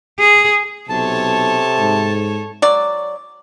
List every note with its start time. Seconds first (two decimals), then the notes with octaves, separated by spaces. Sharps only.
0.20 G#4
0.89 B1 C3 A4 C#5 A5
1.78 G#2
2.62 F#3 D5